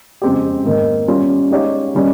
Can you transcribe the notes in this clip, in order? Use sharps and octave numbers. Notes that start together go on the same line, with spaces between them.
F2 C#3 G#3 C4 G4
G#2 D#3 A#3
G3 C#4 F4
G#3 D#4 G4 C#5 F5
D#3 G3 C#4